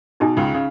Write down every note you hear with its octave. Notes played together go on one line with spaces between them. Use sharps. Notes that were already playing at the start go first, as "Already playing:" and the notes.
B2 D#4 G#4 D#5 G#5
C#2 C#3
C#3